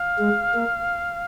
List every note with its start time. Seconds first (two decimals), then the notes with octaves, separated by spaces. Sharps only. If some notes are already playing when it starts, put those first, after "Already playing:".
Already playing: F5
0.19 G#3
0.54 A#3